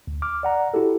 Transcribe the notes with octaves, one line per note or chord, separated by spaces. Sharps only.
D2
D6 F6
D5 F#5 A#5
E4 F#4 G4 A4